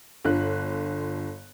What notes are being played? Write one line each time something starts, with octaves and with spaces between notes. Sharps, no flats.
G1 D3 F4 F#6